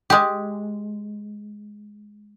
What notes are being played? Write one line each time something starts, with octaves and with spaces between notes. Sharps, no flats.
G#3 G4